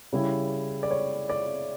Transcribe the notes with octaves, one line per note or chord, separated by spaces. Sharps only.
C#3 G3 C#4 E4
D5
C#5
D5